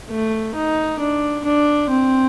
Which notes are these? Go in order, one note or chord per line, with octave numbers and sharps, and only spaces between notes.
A3
D#4
D4
D4
C4